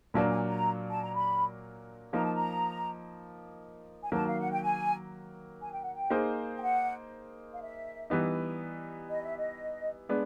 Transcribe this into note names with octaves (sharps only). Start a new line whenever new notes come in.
A#2 F#3 A#3 D4 A5
G#5
A#5
A5
A#5
B5
F3 A#3 D#4 A#5
A5
A#5
G#5
D#3 F#3 A#3 A5
F5
F#5
G5
G#5
G#5
G5
F#5
G5
A#3 D#4 G#4 C5
G5
F#5
F5
E5
E3 G3 B3 D#4
D#5
E5
D#5
G#3 B3 D4